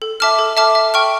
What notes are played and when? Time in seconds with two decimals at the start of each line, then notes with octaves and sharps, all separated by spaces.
0.02 A4
0.20 E5 A5 D6 F6
0.39 A4
0.57 E5 A5 D6 F6
0.75 E5
0.94 G5 C#6 F6